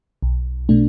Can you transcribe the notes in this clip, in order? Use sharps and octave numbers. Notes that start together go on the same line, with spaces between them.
B1
B2 A3 D4